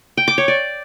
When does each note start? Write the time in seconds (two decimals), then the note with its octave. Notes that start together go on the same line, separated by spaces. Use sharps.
0.17 G5
0.28 D6
0.38 C#5
0.48 D5